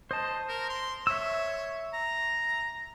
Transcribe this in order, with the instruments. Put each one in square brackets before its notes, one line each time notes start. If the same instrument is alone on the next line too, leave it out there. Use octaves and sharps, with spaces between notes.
[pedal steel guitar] C5 A5 [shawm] D#5
[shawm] A#4
C6
[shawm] C#5 [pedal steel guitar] E5 E6
[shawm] A#5